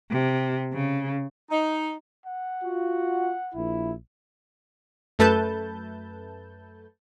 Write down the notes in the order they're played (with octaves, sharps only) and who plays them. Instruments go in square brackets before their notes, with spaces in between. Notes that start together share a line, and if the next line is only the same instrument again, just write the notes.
[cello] C3
C#3
[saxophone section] D#4
[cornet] F#5
[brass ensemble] F4 F#4
A#1 E4
[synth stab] F#2 A3 A4 B4 A5 G6